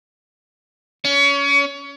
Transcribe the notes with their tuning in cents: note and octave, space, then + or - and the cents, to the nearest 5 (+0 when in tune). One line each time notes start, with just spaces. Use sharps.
C#4 +25 C#5 +30